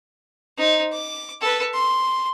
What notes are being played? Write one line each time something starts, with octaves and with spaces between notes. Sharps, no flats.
D#4 C5
D6
A4 B4
C6